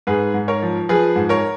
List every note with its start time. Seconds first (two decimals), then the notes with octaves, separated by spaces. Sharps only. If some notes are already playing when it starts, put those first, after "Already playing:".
0.07 G#2 G#4 B4
0.34 G#2
0.48 A#4 C#5
0.62 F3
0.89 F3 G#4 B4
1.16 G#2
1.29 A#4 C#5